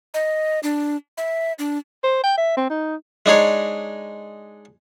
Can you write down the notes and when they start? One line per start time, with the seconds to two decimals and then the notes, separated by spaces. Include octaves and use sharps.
0.14 D#5
0.63 D4
1.17 E5
1.59 D4
2.04 C5
2.23 G5
2.38 E5
2.57 C4
2.70 D#4
3.26 G#3 D4 D#4 G#4 C#5